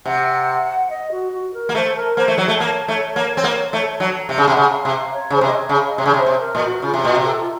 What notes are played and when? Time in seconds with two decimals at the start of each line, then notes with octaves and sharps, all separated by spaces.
0.06 C3 F#5
0.90 D#5
1.11 F#4
1.32 F#4
1.54 A#4
1.69 A#3
1.75 A3 C5
1.96 A#4
2.17 A#3 C5
2.28 A3
2.38 F#3 C#5
2.48 A3
2.60 A#3
2.88 A3
3.16 A#3
3.37 C4
3.44 A#3
3.73 A3
4.00 F#3
4.29 C3 F5
4.38 C#3
4.48 C3 F#5
4.57 C#3
4.71 F5
4.85 C3
4.93 F5
5.14 C#5
5.30 C#3 C5
5.41 C3
5.47 D#5
5.56 C#5
5.69 C#3
5.77 F5
5.89 D#5
5.98 C3 C#5
6.06 C#3
6.14 C3
6.19 C5
6.26 C3
6.40 A#4
6.55 A#2
6.62 F#4
6.82 C#3 F4
6.94 C3
7.04 A#2 F#4
7.15 C3
7.25 A4
7.40 F4